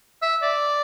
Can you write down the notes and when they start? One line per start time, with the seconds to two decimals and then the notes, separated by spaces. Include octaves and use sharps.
0.22 E5
0.42 D5